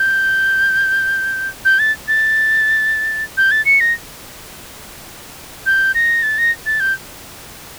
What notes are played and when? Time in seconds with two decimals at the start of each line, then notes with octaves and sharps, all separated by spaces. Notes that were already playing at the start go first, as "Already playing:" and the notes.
Already playing: G6
1.65 G6
1.79 A6
2.08 A6
3.37 G6
3.51 A6
3.65 C#7
3.80 A#6
5.66 G6
5.95 A#6
6.23 A6
6.38 A#6
6.66 A6
6.80 G6